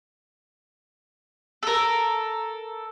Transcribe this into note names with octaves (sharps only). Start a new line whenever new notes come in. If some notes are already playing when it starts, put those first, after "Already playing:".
A4 A#4